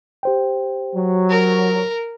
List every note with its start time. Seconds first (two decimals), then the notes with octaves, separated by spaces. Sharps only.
0.23 G4 C5 G5
0.95 F#3
1.30 A#4